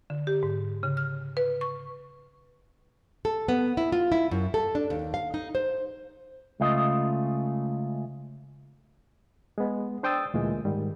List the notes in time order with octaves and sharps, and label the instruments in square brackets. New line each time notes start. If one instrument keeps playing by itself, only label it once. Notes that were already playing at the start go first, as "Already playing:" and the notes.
[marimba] D3
G4
G#2
C#3
F6
B4
C#6
[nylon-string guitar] A4
B3
E4
F4
E4
F#2
A4
D4
D#2
F5
D#4
C5
[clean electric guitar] C#2 C#3 A3 F4 D#5
[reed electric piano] G#3 B3
D4 C5 G5 D#6 E6 A6
D2 A#2 E3 G#3
G#2 D#3 G3